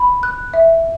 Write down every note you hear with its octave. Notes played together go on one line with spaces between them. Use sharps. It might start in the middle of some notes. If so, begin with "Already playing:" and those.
Already playing: B5
F#6
E5